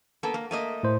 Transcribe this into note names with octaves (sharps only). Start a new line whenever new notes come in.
A#3 B3 A4
A#3
A3 A#3 D#5
A2 C5